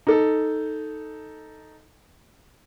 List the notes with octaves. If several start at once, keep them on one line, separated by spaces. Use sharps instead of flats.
D#4 A4